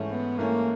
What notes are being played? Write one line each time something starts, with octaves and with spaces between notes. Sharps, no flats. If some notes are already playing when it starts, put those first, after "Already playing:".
Already playing: G#2 E3 A3 C#4
B3
G#2 E3 A3 A#3 C#4